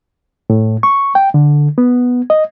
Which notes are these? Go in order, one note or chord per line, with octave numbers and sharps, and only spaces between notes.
A2
C#6
G5
D3
B3
D#5